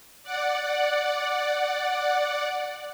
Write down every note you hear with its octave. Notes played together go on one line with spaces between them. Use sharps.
D5 F#5